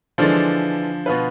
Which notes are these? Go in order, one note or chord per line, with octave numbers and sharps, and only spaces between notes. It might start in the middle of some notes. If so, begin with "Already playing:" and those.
D3 E3 F3 G#3 D4 F4
B2 B3 F4 B4